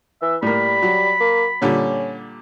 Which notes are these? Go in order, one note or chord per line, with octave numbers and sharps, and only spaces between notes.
E3 E5
A2 G3 A#3 B5
F#3
A#3
A#2 D3 G3 C#4